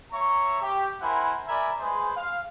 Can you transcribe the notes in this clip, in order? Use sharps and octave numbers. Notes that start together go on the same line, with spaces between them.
C#5 E5 A#5 C#6
G4
E4 A#4 C5 F#5 G#5 B5
A#4 D5 E5 G#5 A#5 B5
G#3 G#4 B4 C5 C6
F5